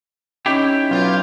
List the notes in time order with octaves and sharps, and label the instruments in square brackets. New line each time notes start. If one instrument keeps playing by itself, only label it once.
[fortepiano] C#4 D#4 [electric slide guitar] E4 G4 [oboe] G5
[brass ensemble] B1 F4